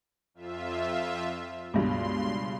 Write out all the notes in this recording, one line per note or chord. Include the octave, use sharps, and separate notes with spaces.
F2 F4 E5
C#2 G2 B2 C6